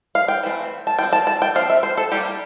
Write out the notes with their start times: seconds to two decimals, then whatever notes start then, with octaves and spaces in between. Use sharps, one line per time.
0.15 F5
0.28 G5
0.43 E3 A3 C4
0.87 A5
0.99 F3 C4 G5
1.13 A5
1.27 A5
1.42 G5
1.55 F3 C4 F5
1.70 E5
1.83 C5
1.97 A4
2.12 G3 A#3 D4 G4